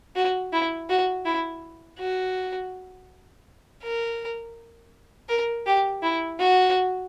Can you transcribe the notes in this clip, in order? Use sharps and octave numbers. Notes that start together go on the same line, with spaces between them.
F#4
E4
F#4
E4
F#4
A#4
A#4
G4
E4
F#4